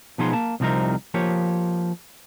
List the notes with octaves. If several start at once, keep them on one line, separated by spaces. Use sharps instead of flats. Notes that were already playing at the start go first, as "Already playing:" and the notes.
B2 F3 B3 D#4 G#4 C6
A#3 A5
C2 C3 F3 C4 D#4 A#4
F3 A#3 G4 C#5